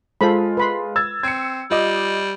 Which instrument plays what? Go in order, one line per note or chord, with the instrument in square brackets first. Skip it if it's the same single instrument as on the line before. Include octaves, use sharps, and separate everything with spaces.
[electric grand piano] G#3 F4 [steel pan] A4 C5 B5
[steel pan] B4 B5 C6
[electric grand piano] E6 G#6 A6
[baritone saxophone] C4 [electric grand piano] G#6 C#7
[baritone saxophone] G3 [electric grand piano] F4 D#5 D6